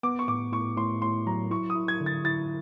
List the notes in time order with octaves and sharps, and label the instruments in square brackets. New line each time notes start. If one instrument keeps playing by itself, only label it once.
[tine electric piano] B3 [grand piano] D6
[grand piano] C#6
[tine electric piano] A2 [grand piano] D6
[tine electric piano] A2 [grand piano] C#6
[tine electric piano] A2 [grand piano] C6
[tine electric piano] A2 [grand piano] C6
[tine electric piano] F#3 [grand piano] A#5
[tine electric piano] E4 [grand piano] C#6
[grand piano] D#6
[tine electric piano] E4
[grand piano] G#6
[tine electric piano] D3
[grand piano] A6
[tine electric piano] E4 [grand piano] A6